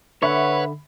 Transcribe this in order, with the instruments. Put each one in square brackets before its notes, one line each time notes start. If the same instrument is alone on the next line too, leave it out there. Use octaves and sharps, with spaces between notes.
[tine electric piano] D3 [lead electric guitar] B4 [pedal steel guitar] C#5 F#5 [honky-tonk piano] E5 B5